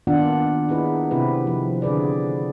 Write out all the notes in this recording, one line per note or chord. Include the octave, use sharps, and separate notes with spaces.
D#3 A#3 B3 D4 F4 F#5
D#4 E4 G#4 B4
C3 C4 E4 G4 B4
F3
D3 G#4 B4 D5